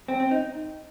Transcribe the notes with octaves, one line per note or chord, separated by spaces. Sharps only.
C4
C4
D#4